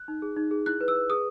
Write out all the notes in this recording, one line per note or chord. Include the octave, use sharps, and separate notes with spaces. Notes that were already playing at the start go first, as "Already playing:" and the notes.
Already playing: F#6
D#4
G#4
D#4
G#4
E4 F#6
B4
E6
B4
G#4 D#6